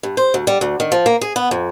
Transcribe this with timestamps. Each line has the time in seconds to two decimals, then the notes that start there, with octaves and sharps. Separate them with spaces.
0.03 G2
0.17 C5
0.34 D2
0.47 G3
0.61 D2
0.80 D#3
0.92 F3
1.06 A#3
1.21 G#4
1.36 B3
1.51 F2